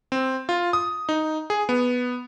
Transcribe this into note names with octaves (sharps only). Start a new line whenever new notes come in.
C4
F4
D#6
D#4
G#4
B3